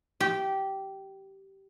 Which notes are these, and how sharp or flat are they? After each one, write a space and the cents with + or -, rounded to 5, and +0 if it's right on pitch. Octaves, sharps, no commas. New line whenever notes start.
G4 -15